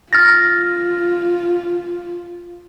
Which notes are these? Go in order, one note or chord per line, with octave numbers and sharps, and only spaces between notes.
F4 F6 A6 A#6